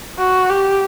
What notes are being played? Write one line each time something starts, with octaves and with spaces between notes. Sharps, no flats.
F#4
G4